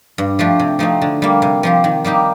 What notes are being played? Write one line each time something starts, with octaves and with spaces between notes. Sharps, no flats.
G2
F3 A3 D4 G4
C3
F3 A3 C4 D#4
D3
G3 A#3
C3
F3 C4 G4
D#3
G3 A#3 D#4 G4